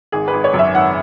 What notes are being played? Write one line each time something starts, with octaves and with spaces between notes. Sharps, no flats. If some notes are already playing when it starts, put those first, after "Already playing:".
G#1 G#4
B4
G#1
C#5
F#2
E5
G#1 F#5